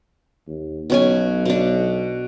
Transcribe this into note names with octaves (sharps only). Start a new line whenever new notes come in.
D#2
B1 B2 C#4 G#5
B2 D4